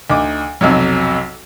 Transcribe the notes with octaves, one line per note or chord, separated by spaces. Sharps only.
D2 D#4 D6
B1 F2 C3 F#3